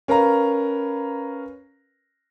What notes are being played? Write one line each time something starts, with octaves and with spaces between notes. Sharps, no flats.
C#4 A#4 B4 F5 A#5